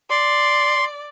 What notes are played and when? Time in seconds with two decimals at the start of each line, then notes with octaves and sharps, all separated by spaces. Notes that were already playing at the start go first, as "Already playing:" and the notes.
0.10 D5 C6